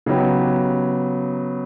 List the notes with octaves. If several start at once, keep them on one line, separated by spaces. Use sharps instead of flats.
C#3 F#3 B3 D#4 G4